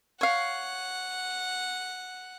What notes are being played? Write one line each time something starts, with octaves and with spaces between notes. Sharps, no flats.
C#5 F5 F#5